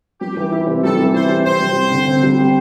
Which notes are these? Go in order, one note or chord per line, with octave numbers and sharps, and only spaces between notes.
G3 G4
E3
E4
C3
G3 A4
E3
E4 C5
C3
C4 C5
G3
G4
D3
C4
G3
G4